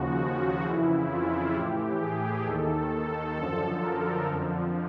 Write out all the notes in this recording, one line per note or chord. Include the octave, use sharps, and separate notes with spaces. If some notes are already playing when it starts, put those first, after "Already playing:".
Already playing: D#2 C#3 F3 F#4
F#4
F2 C#3 E3 E4
F4
A2 E3 G4
G#4
D#2 D#3 A4
F#2 D3 F3
A#4
F2 D3 F3